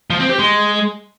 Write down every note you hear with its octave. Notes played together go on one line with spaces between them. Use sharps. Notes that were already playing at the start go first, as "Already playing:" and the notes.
F3
C4
G4
G#3